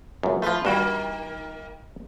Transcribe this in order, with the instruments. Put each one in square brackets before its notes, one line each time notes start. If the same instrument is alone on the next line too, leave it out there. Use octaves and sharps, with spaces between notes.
[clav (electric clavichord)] C#2 F#2
[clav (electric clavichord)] F3 A3 [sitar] F4 B4
[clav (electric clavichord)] G2 F#4 [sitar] D#3 A#3